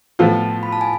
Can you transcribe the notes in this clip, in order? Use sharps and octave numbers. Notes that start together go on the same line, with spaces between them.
A2 F3 B3 F4 A4 A5
B5
A5
G#5